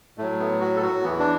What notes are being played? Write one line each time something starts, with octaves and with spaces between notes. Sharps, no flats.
A2 F#3 A3
B3
F#4
A4
F#4
E2 E3 B3
D4